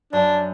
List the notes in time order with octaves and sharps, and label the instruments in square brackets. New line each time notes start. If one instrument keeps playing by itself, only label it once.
[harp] F#2 [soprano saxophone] D4